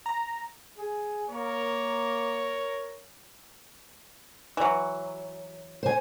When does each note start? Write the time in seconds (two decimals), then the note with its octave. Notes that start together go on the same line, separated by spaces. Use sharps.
0.06 A#5
0.77 G#4
1.28 A#3 A#4 C#5
4.57 E3 F#3
5.83 C5 G#5